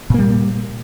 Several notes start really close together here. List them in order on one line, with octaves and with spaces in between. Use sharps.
A#2 A#3 G3